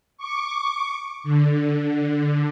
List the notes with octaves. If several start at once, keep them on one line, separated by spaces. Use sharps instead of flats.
C#6 D6
D3